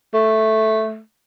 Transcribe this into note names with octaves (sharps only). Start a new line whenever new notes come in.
A3